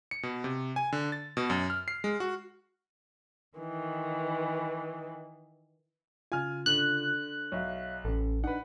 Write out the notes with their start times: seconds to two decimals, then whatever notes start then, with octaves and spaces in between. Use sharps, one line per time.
0.11 C#7
0.23 B2
0.44 C3
0.76 G#5
0.92 D3
1.12 A6
1.37 B2
1.50 F#2
1.70 F6
1.88 C7
2.04 G#3
2.20 F#4
3.56 D#3 E3
6.32 C#3 F4 G#5 F6
6.66 D3 F#6
7.52 B1 C#5 E5 F5
8.05 A1 C#4 A4
8.44 D4 D#4 B4 F#5